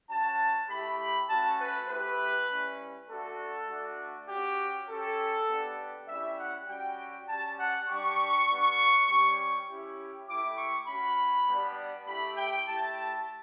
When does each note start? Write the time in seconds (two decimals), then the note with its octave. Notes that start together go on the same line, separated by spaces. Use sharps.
0.10 C#4 F#4 A5
0.69 A3 E4 G4 B5
1.30 A3 C#4 F#4 A5
1.60 B4
1.89 A3 E4 G4 B4
2.49 G3 C#4 E4
3.09 A3 D4 F#4 A4
3.69 A3 D4 F#4
4.29 C#4 F#4 G4
4.89 C#4 G4 A4
5.49 B3 D4 G4
6.08 G3 C#4 E4 G4 E5
6.39 F#5
6.68 G3 C#4 F#4 G5
7.29 G3 C#4 G4 A5
7.58 F#5
7.89 G3 D4 G4 C#6
8.48 G3 B3 D4
9.08 G3 C#4 G4
9.69 C#4 E4 G4
10.27 A3 E4 G4 D6
10.58 C#6
10.88 C#4 F#4 B5
11.47 G3 B3 D4
12.07 A3 E4 G4 B5
12.37 G5
12.68 A3 E4 G4 A5